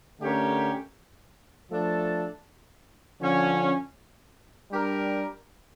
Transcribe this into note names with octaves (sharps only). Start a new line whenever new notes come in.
D3 A3 C#4 G4 A#4
F3 A3 D4 A4
D3 F3 C#4
G3 D4 G4 A#4